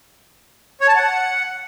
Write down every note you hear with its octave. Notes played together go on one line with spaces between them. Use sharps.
C#5
A5
F#5